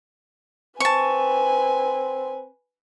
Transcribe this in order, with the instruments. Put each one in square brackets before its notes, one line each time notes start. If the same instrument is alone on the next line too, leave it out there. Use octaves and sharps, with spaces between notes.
[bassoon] C4 [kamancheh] B4 G#5 [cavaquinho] A5 C#6